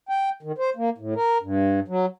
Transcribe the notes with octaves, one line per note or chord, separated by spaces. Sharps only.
G5
D#3
C5
A#3
A2
A#4
G2
F#3